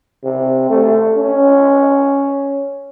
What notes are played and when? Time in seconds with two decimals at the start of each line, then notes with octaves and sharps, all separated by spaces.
0.24 C3
0.69 A3
1.17 C#4